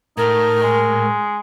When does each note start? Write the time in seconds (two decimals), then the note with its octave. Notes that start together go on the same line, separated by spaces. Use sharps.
0.17 A2 D#4 A#4
0.63 G#3